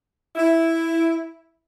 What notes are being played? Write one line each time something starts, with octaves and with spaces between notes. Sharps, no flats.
E4